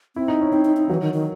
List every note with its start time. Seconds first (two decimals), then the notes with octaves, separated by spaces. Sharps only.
0.16 C4 E4
0.28 D#4
0.41 C#4
0.52 C4 D#4
0.65 D#4
0.77 D#4
0.89 E3 F#3
1.01 D#3
1.14 D#3